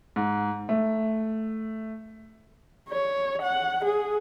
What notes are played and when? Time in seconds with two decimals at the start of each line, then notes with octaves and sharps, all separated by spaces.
0.16 G#2
0.69 A3
2.89 C#5
3.42 F#5
3.85 G#4